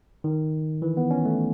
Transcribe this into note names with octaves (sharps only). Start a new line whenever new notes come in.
D#3
E3
B3
C#4
A3